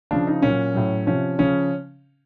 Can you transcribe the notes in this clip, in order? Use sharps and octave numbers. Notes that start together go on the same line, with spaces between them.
C#3 F3 D4
D#4
A#2 F#3 C#4
A2 F#3
C3 F3 C#4
C#3 F3 C#4